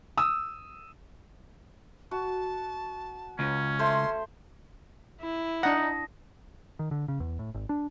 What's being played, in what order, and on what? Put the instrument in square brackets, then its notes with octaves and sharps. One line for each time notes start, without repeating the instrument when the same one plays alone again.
[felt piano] D#6 E6
[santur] F#4 [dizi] A5
[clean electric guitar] C#2 [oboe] C#4
[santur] A3 C5 [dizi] C6
[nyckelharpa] E4
[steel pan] D4 F#5 [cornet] D#4 [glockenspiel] A5 D#6 A#6
[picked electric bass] D#3
D3
C#3
E2
A2
G#1
D4